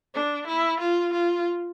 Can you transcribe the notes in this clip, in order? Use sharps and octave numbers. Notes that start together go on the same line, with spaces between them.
D4
E4
F4
F4